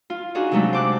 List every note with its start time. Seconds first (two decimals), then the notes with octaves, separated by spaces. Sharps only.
0.10 F4
0.35 D4 D#4 F#4 G#4
0.52 C3 F#3 G#3 A3 D4 A4
0.73 C5 D6 F#6